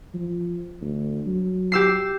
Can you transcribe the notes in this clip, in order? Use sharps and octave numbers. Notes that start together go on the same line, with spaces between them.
F3
D2
F#3
G4 E6 C7